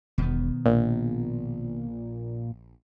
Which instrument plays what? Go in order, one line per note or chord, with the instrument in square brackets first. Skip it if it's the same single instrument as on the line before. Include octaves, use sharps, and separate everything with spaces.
[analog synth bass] E1 [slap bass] B2 D#3 B3
[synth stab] A#1 [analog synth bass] A#2